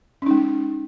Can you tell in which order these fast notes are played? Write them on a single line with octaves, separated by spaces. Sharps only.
C#4 D#4 G#3